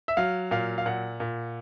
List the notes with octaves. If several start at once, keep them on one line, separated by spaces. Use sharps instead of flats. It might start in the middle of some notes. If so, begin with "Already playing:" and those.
E5
F#3 F5
A#2 F5
F5
A#2 F#5
A#2